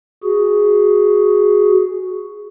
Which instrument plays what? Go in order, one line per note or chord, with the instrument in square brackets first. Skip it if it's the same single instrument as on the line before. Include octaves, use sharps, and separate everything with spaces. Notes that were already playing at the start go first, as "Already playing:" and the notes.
[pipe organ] F#4 G#4